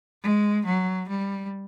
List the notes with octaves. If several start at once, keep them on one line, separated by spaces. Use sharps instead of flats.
G#3
F#3
G3